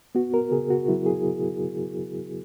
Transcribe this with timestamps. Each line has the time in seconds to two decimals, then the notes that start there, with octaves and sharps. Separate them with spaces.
0.15 B3 F#4
0.34 A#4
0.51 C#3 G#4
0.70 F#4
0.88 F#3 E4
1.06 G#4